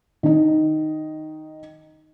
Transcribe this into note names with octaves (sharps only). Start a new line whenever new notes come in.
D#3 D#4